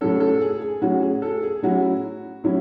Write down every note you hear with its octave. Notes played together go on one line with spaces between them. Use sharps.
A2 F#3 C#4 A4
A4
G#4
G#4
A2 F#3 C#4 F#4
G#4
A4
G#4
A2 F#3 C#4 E4 F#4
A2 F#3 C#4 E4